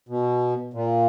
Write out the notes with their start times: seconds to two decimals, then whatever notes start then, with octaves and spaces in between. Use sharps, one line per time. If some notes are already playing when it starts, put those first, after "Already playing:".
0.09 B2
0.73 A#2